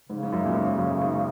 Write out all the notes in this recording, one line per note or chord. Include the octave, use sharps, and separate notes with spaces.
G#2 C#3
G#2
F#2
A#2
G#2
F#2
G#2